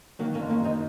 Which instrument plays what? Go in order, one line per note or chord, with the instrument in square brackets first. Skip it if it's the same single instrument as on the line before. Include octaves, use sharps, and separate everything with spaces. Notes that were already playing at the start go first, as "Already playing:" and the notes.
[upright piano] D#3 [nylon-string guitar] F#3 A#3
[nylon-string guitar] A#3 C#4
[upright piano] F#1
[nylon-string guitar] A#3 C#4
[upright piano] F#2 [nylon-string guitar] C4 D#4